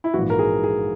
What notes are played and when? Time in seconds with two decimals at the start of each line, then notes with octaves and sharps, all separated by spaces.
0.04 E4
0.14 A#1 G#2 E3 F#4
0.30 A#4
0.39 G#4
0.64 G#4